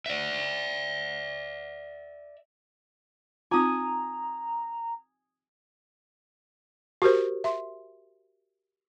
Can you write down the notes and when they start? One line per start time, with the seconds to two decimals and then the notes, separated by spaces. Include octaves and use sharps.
0.06 D5 E5
3.51 C4 D#4 F4 G#5 A#5 D#6
7.02 F#4 G4 A#4 C5
7.44 E5 C6